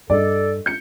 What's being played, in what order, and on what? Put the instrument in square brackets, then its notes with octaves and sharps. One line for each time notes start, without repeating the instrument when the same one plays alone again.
[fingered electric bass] G2 [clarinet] A4 [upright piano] D5 D#5
[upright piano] G6 C#7